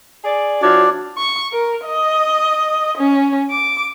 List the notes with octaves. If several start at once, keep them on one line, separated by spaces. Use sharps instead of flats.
G#4 D5
F3 D4 E4 F#4 C#5 D5
C#6
A#4
D#5
C#4
D6